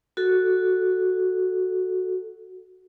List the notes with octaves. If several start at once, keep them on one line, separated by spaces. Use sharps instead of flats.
F#4 A4